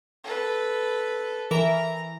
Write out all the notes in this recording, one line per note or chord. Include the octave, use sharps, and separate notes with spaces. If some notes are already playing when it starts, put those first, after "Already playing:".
A4 B4
E3 A#4 E5 A#5